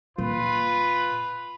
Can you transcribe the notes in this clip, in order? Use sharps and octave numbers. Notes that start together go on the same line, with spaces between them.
A#2 F4 B4